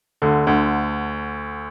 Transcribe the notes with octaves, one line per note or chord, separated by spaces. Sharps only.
D2 D3
D2 D3